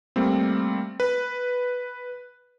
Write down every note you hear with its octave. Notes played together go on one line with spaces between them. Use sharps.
G3 A3 A#3 C4
B4